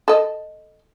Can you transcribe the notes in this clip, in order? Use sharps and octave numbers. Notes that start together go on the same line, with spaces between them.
A4 D#5